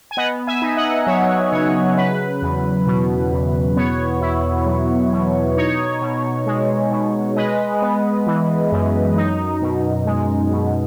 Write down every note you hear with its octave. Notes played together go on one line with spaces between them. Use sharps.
G#5
B3 D#5 F#5
E5 G#5
D#4
D#5 F#5
F#3 C#5 E5
C#3 C#5
F#3 B4
E2
B2
E2
B3 C#5
E4
F#3
B2
D#4 C#5
B2
G#3
B2
G#3 B4 D#5
B3
E3
F#2
D#4
B2
G#3
B2